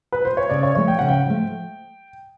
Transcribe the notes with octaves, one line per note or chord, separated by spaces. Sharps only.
B4
C5
C#5
C#3 D5
C#5
F3 A3 C#5
G5
C#3 F#5
G5
F3 A3